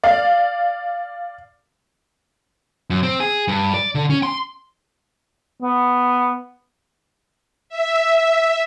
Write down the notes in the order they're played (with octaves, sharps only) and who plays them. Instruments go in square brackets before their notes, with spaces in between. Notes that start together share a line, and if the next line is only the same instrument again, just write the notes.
[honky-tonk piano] D5 F5
[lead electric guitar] F#2
C4
G#4
G2
D5
D3
C#4
C6
[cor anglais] B3
[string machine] E5